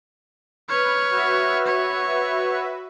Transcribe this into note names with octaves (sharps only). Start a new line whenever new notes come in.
B4 C#5 F6
F#4 B4 E5
C#5